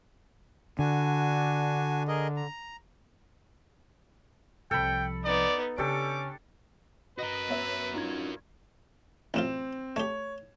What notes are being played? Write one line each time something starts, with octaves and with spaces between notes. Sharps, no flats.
D3 D4 F#4 G#5
G#4 A#4 D#5
A#5
C2 F3 A4 G5 B5
B3 D#4 D5
C#3 C#4 D4 G4 A4 D6
F#4 A#4 B4 D#5
B3 C#5 E5
G2 C#4 D#4 F4 G#6
A1 F#2 C4 F4 E7
A3 G4 C#5